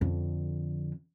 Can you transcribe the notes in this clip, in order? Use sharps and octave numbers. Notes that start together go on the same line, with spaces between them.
F2 D3